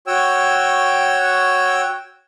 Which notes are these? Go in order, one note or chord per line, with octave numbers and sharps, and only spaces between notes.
F#4 C#5 G5 E6